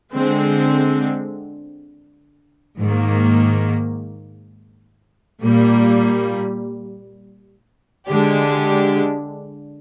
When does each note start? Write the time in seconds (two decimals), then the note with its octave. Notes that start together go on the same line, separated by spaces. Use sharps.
0.13 D3 G#3 C4
2.77 G#2 D#3 A#3
5.42 A#2 G3 A#3
8.07 D3 G#3 D4 G4